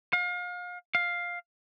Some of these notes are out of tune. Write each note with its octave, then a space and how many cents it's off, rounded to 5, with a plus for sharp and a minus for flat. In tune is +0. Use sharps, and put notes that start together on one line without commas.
F5 +35
F5 +5